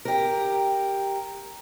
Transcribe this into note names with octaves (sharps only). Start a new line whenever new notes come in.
G4 A#4